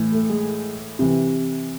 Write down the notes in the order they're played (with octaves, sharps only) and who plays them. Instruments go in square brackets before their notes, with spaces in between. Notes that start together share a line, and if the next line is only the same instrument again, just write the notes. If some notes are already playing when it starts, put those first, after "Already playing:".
Already playing: [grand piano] A2 E3
A3
G#3
C3 E3